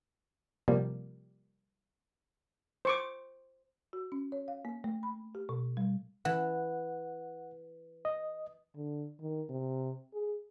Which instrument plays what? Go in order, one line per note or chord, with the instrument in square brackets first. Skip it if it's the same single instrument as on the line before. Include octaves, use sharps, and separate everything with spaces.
[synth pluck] C3 F3 G3 A#3
[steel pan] C5 C#6 D6
[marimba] F#4
C#4
C#5
F5
A#3
A3
B5
G4
B2
G3
[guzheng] E3 [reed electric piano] F#5
[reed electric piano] D#5
[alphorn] D3
D#3
C3
G#4